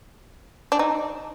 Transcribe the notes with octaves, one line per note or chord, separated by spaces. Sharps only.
D4
D#4